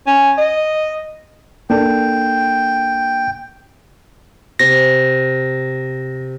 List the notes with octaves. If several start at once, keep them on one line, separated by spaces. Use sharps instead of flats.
C#4
D#5
A#3 D4 A4 G5
C3 A#6